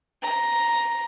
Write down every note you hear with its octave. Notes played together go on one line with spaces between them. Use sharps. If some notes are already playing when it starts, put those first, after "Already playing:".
A#5